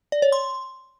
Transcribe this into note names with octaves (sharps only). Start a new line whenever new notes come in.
D5
C#5
C6